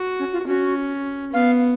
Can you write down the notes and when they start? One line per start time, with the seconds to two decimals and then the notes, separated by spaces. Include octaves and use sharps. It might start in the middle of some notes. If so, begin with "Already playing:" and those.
Already playing: F#4
0.19 C#4
0.33 F4
0.47 C#4 F#4
1.33 B3 F5